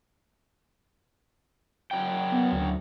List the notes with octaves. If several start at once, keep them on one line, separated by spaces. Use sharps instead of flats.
F#2 F#3 G5
B3
D2